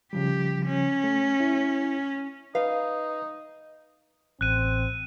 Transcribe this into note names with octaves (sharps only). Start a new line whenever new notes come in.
C#3 F3 G3 G4
C#4
A3
E4
D#4 B4 F5
A1 C4 F#6 D#7